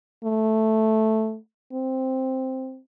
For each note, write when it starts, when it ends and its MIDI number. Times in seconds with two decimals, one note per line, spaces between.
0.24 1.37 57
1.73 2.79 60